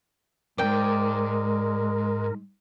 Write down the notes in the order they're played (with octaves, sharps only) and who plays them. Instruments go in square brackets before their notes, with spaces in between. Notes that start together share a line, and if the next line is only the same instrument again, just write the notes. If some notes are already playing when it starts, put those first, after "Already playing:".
[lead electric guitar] F2 G#2 [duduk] G#3 [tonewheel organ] A#4 [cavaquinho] D5 G5